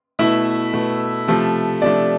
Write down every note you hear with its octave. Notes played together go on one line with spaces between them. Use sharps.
B2 A3 E4 E5
B2 A3
C3 F3 A3
C3 F3 A3 D4 D5